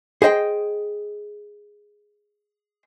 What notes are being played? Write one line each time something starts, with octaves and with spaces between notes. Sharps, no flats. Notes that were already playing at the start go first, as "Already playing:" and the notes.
G#4 C5 D#5 G5